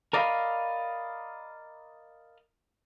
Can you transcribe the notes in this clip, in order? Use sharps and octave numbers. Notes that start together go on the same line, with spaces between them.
A#4 D5 D#5 F5 G#5 B5